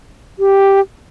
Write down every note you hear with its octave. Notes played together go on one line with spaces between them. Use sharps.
G4